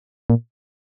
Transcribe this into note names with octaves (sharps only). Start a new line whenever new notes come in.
A#2